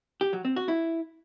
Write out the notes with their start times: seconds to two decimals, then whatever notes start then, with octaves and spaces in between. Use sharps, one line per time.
0.21 G4
0.33 F#3
0.45 C4
0.56 F#4
0.68 E4